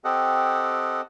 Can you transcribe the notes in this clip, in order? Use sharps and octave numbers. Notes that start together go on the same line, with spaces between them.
C4 G4 A4 D#5 F#5